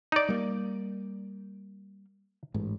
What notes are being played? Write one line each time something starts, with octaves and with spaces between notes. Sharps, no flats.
D#4 D5
G3 A#3
A1 G#2